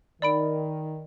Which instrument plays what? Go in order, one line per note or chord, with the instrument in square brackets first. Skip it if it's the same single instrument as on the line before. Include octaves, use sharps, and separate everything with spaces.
[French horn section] D#3 [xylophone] D5 B5 D7